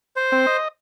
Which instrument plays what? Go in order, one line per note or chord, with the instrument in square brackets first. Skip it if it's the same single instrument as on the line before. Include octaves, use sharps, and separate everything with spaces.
[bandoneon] C5
[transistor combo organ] C4
D#5